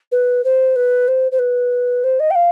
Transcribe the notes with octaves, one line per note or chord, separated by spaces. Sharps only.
B4
C5
B4
C5
C5
B4
C5
D#5
G5
F5